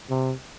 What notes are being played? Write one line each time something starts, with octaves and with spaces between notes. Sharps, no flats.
C3